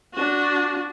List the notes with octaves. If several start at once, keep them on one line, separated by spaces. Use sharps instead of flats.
D4 F#4